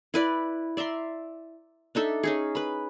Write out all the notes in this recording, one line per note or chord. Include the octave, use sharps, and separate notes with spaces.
E4 B4 D5
D5 E5 A#5 C6
D4 D#4 A4 E5
C#4 D#4 G#4
B4 B5